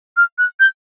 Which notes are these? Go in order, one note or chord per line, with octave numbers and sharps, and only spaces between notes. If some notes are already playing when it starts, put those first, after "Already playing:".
F6
F#6
G6